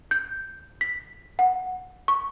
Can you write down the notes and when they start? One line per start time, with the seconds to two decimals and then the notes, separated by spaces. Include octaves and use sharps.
0.11 G6
0.81 B6
1.39 F#5
2.08 C#6